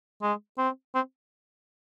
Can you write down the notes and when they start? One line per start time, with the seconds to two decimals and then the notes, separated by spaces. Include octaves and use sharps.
0.22 G#3
0.58 C4
0.95 C4